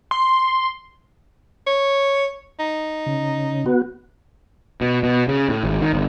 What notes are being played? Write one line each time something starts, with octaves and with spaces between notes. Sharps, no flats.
C6
C#5
D#4
C#3
B3 F#4
B2
B2
C#3
A2
G#1
D#3
G1